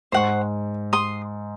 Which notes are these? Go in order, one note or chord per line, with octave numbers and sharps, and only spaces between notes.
G#2 C5 F#5 C#6
C6 D#6